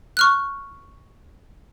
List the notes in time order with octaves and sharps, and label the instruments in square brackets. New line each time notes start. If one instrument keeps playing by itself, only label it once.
[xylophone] C#6 F6 F#6